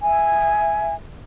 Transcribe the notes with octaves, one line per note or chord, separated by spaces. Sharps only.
E5 G#5